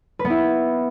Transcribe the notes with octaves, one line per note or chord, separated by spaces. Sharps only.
B4
B3
E4